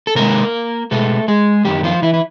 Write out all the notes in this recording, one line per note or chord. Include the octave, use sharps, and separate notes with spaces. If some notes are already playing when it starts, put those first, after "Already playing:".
A4
C3 D#3 G#3 A#3 A#4
B2 G#3 A3 A4
G#3 G#4
F#2 D#3 G3 A#3 G4
F3 F4
E3 E4
E4